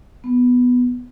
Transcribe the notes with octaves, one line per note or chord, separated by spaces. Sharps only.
B3